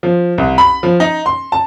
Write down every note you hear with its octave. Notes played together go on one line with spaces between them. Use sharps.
F3
C2
B5
F3
D#4
C6
A5